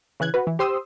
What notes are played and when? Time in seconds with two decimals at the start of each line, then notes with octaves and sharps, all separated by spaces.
0.20 C#3 E3 F#6 G#6
0.34 F#4 B4
0.47 E3
0.59 G4 C5 C6 D#6 E6